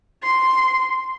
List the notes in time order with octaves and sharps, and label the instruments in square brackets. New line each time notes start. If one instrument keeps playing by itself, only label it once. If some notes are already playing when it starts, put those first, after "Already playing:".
[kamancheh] C6